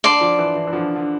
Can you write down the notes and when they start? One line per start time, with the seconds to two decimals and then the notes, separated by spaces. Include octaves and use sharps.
0.04 D3 D5 A5 C6
0.21 D3 F3
0.39 E3
0.56 E3
0.67 E3
0.73 D3 F3
0.96 D3